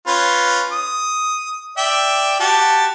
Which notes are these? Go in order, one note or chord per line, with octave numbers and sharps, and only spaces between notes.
C#4 F4 B4
D#6
D5 E5 G5
F#4 G4 A5